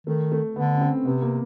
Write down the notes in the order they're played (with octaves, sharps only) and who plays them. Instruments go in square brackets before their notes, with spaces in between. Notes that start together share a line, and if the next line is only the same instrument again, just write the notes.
[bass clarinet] D#3 [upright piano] A3
[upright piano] A3
[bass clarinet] D3 [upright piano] B3
[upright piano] C#4
C4
[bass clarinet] C3 [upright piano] B3
[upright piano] A#3